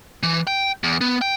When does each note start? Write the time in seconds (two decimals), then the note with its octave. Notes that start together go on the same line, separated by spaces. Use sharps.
0.23 E3
0.47 G5
0.84 E2
1.01 B3
1.21 G5